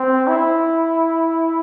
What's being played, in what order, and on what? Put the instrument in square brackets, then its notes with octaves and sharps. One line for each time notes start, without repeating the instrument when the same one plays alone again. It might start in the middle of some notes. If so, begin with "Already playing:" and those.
Already playing: [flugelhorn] C4
E4